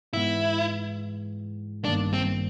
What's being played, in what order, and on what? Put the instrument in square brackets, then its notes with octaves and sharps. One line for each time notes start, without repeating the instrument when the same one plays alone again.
[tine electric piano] G#2 E3 G#3 B3 [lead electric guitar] E4
[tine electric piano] A1 G2 D#3 G3 A#3 [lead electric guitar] D4
[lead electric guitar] C4